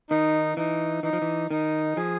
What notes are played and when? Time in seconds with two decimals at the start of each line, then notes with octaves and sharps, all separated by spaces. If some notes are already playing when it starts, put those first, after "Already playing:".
0.10 D#3 D#4
0.57 E3 D#4
1.03 E3 D#4
1.13 F3
1.22 E3
1.51 D#3 D#4
1.97 F3 G#4